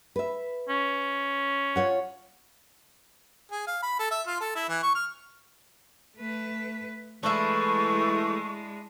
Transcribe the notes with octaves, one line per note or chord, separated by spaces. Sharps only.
B4 E5
C#4
F4 C#5 F#5
G#4
F5
B5
A4
E5
F4
A4
E4
E3
C#6
F6
A3 B4
E3 G#3 A3 D4 E4 C#6